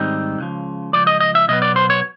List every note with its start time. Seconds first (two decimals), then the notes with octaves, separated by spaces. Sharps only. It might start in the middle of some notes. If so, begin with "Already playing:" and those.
Already playing: G#2 D#3 G3 C4 D#4
0.38 C#2 C#3 F3
0.93 C#2 C#3 F3 D5
1.07 D#5
1.20 D#5
1.35 E5
1.48 B2 F#3 B3 D#5
1.62 D5
1.76 C5
1.90 C#5